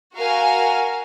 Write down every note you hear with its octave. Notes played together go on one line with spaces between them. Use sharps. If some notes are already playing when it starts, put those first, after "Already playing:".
F#4 A#4 F5 G#5